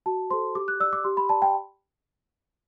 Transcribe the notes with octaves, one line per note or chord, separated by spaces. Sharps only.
F#4 A5
A4 C5 C6
G4 D6
F#6
D5 E6
D6
G4 C6
B5
D5 A5
G5